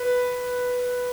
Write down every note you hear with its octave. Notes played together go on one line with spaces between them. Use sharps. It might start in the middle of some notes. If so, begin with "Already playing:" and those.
Already playing: B4